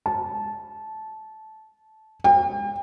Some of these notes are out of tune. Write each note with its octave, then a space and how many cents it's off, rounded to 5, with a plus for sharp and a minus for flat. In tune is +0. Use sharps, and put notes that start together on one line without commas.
A5 -15
G5 +40